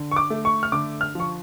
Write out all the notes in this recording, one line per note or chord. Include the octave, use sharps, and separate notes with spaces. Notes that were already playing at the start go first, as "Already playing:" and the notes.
Already playing: D3
C#6
D6
A3
C#6
F6
D3 D6
F6
F3 C#6